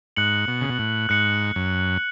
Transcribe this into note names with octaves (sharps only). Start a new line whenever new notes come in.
G#2 F#6 C#7 F#7
B2
C#3
B2
A2
G#2 F#6 C#7 F#7
F#2